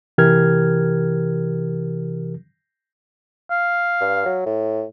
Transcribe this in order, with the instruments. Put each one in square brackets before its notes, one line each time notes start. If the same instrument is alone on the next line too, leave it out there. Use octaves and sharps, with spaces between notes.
[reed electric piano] C3 E3 G4 A#4 F6 G#6
[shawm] F5
[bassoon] G2
F#3
A2